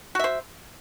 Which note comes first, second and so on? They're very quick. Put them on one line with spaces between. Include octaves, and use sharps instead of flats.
F#4 E5 C5